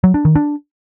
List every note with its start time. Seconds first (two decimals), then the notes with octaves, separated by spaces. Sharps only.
0.04 F#3
0.14 D4
0.25 D#3
0.36 D4